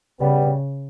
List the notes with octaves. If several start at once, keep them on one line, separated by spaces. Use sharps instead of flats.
C#3 G3 B3